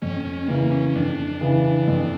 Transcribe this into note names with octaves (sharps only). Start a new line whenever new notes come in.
F2 C#4
C#4
C#3 E3 A#3
C#4
C#4
F2 D4
C#3 E3
F2